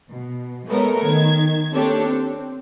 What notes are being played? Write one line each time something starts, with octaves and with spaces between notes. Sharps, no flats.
B2
G#3 A3 B3 A4 A#4 C#5
D#3 G#6
A#3 C4 D4 G4 A4 C#5
C4